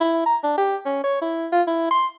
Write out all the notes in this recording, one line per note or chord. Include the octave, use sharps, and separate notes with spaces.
E4
A#5
D4
G4
C#4
C#5
E4
F4
E4
C6